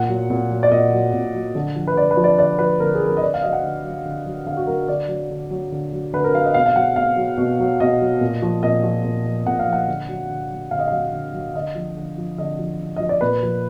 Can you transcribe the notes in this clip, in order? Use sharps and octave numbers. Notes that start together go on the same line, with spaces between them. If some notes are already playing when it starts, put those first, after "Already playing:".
Already playing: A#2 F#5
F#3
A#2
F#3
D5
A#2 D#5
F#3
A#2
F#3
D3
F3
B4
D3 D5
B4
F3
D5
D3 D5
F3 B4
D3 A#4
G#4
F3
A#4
D#5
D3 D5
F5
F#3 D#5
F#5
D3
F#3
D3
F#3
D3 F5
F#4
F#3 A#4
D3 D5
F#3
D3
F#3
D3
F#3
D3 B4
A#4
F#3 F5
D#5
B2 F5
F5
F#3 F#5
B2 F5
F#3
B2
F#3
B2 D#5
F#3
A#2
F3
A#2 D#5
F3
A#2
F3
A#2 F#5
F5
F3
F#5
D3
F#3
D3
F#3
D3 F5
D#5
F#3 F5
D3
F#3
D3 D#5
F3
D3
F3
D3 D#5
F3
D3
F3 D#5
D5
A#2 B4
F3